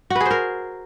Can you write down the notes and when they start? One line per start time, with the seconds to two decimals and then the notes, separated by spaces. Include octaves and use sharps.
0.10 F#4
0.15 B4
0.20 G#4
0.26 C5
0.31 A#4